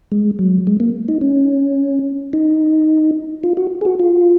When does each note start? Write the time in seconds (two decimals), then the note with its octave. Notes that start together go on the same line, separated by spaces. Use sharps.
0.12 G#3
0.39 F#3
0.67 G#3
0.80 A#3
1.08 D#4
1.21 C#4
2.33 D#4
3.44 F4
3.57 F#4
3.81 G#4
3.85 F#4
3.99 F4